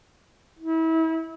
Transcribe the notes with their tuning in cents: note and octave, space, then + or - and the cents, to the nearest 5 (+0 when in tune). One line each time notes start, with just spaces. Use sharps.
E4 -35